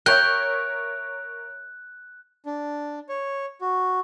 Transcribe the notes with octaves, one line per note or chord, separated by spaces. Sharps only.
A#4 C#5 E5 G5 F#6
D4
C#5
F#4